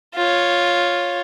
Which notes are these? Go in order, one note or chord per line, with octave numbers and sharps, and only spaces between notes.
F4 C#5